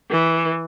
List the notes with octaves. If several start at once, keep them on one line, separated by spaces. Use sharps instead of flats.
E3